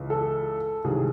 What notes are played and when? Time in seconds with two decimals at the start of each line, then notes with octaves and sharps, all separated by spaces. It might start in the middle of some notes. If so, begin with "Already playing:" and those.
Already playing: C#2 C#3 E3
0.10 A4
0.84 C2 C3 D#3 F#3 G#4